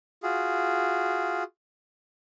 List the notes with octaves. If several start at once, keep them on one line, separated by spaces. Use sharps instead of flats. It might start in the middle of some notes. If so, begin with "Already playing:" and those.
F4 F#4 G#4